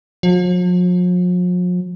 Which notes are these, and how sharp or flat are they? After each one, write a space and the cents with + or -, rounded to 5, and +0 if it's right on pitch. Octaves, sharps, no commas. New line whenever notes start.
F3 +45